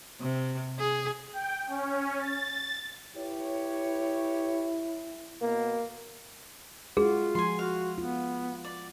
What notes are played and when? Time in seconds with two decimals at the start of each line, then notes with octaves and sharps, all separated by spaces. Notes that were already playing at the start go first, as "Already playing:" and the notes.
0.21 C3
0.79 G#4
1.33 G5
1.67 C#4
2.19 A6
3.16 E4 G4 B4 C#5
5.41 B2 A#3
6.97 G#3 F4 F#4 G#4
7.35 F3 G#3 G#5 C6
7.59 F#4 F5
7.98 B3 F4
8.64 D5